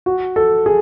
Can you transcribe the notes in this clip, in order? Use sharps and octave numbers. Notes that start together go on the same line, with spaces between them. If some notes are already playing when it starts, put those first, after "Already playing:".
F#4
A4
G#4